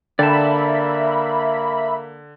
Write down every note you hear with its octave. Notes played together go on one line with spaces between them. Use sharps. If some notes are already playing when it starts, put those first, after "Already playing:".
D3 A#3 D5 E5 G5 A5 B5